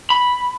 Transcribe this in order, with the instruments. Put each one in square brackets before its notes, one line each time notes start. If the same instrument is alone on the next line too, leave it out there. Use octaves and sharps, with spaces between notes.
[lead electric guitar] B5